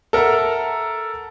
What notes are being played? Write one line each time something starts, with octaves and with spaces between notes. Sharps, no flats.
A4 A#4 E5 F#5 A#5